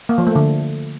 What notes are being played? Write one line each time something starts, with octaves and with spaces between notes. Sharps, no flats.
A#3
F3
A3
D3